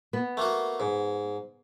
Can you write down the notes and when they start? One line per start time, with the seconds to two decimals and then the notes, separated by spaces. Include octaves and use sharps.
0.13 B3
0.37 A3 A#3 F#4
0.80 G#2